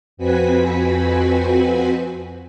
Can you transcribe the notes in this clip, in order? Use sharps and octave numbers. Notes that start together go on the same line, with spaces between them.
F2 C4 F#4 B4 G#5 B6